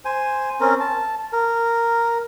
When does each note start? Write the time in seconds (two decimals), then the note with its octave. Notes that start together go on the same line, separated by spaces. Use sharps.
0.05 C5 G#5
0.60 C4 C#4 A#4
0.80 A5
1.33 A#4